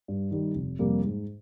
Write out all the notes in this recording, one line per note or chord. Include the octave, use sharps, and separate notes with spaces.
G2
D#3 G3
F1
F2 C3 G3 A#3
G#2